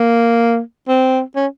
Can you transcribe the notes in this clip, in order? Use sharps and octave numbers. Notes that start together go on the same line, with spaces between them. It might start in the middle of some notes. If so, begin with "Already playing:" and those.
Already playing: A#3
C4
C#4